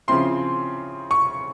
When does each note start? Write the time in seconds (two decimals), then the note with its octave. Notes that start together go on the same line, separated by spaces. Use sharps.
0.08 C#3 F3 C4 E4 C6
1.11 C#6